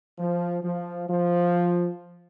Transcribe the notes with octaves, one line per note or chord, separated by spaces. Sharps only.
F3
F3
F3